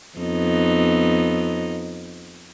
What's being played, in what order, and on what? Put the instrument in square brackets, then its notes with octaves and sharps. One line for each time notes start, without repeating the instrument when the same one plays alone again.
[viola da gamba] F2 B3 D#4